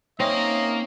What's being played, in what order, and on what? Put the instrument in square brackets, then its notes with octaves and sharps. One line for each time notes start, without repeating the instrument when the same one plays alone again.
[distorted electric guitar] A#3 A#5 [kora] C4 C#4 [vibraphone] D#4 C#5 E5 [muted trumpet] D#5